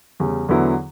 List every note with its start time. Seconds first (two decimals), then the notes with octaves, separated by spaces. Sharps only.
0.20 E2 C#3 G3
0.49 E2 D3 F#3 B3 E4